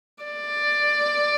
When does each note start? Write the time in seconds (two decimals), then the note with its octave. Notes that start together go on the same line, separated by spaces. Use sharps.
0.23 D5